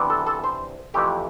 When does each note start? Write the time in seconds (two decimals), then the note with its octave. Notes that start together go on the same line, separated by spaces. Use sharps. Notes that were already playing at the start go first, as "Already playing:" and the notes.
Already playing: C3 E3 B3 D4
0.10 A4
0.27 A4
0.44 C5
0.94 F2 C3 E3 A3 G4